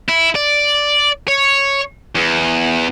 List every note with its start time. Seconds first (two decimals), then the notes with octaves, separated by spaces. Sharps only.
0.09 E4
0.35 D5
1.28 C#5
2.15 E2